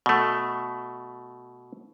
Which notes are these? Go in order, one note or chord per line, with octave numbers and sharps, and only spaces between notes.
B2 A3